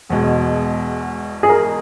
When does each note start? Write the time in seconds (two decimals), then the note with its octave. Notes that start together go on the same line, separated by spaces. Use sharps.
0.09 E1 E2 B2 G#3
1.43 G#4
1.49 A#4